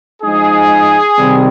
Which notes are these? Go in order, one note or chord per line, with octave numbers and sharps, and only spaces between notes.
F3 G#3 D#4 G#4
C3 D#3 G3 C4